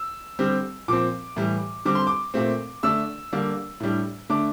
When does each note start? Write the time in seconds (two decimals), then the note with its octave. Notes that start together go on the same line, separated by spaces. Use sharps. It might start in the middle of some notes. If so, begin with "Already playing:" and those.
Already playing: E6
0.39 D3 G3 C4
0.88 A#2 F3 C4 D6
1.36 A2 E3 G3
1.85 D3 G3 C4 D6
1.95 C6
2.07 D6
2.34 A#2 A3 C4
2.83 D3 A3 D4 E6
3.33 D3 G3 A#3 D4
3.80 A2 G3 D4
4.30 D3 A3 D4 D6